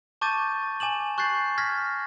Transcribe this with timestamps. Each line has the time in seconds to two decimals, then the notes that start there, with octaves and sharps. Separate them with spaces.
0.21 A5 C#6 D6 G6 A6 D#7
0.80 G#5 D6 E7 F#7
1.18 C#6 F#6 G6 A6 C7
1.58 F6 G#6 A#6 B6